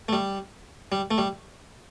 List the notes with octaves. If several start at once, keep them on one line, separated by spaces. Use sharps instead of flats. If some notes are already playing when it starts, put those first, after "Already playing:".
A3
G3
G3
A3
G3